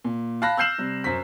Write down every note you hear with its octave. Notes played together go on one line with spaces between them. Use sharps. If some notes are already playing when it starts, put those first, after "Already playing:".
A#2
F5 A5 B5 F#6 A#6
E6 F6 G6 C7 E7 F#7
C3 G3
F#2 C5 B6